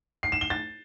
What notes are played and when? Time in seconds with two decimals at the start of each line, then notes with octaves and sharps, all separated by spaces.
0.23 C7
0.32 E7
0.41 G7
0.50 A6